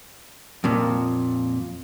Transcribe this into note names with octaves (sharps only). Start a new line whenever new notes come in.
F2 A#2